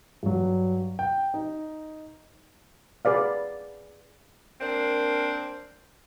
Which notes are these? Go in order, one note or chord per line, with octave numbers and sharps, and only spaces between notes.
G2 F#3
G5
D#4
G#4 B4 D5 F5
A#3 C4 D4 A#4